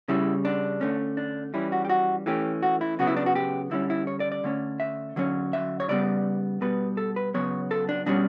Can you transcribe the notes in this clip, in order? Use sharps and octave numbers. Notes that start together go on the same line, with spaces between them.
C#3 G3 C#4 E4
D4
D3 A3 C#4
D4
E3 G3 C#4 E4
F#4
G4
F#4
E3 A3 C#4 G4
F#4
E4
C#3 F#3 B3 F#4
E4
D4
F#4
G4
D3 G3 C#4 E4
E4
C#5
D5
D5
D3 A3 C#4
E5
D3 F#3 C#4
E5
C#5
C#3 G3 B3 D5
B2 G3 B3 B4
A4
B4
C#3 F#3 B3 C#5
A4
D4
B2 G3 C#4 D4